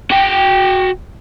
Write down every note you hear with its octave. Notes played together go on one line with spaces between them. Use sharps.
F#4 G5